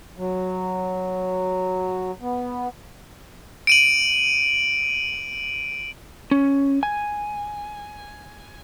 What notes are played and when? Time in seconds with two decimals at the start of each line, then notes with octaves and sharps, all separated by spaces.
0.18 F#3
2.21 B3
3.67 D7 D#7 F#7
6.31 C#4
6.83 G#5